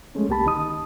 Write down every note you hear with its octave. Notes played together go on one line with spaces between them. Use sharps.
F3 G#3 A3 C#4
C2 A#3 G4 A5 B5
D#3 D#4 D#6